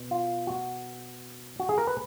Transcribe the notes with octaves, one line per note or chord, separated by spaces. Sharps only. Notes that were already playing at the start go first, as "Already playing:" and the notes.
Already playing: B2
F4
F#4
F#4
G#4
A#4
B4